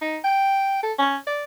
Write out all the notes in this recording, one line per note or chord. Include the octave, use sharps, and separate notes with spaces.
D#4
G5
A4
C#4
D5